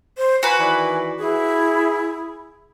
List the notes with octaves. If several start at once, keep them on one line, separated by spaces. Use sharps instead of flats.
C5
F#4 B4 G#5
D#3 E3 D5
E4 G#4